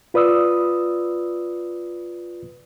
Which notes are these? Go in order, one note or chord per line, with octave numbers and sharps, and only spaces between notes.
F4 B4 D5 D#6 E6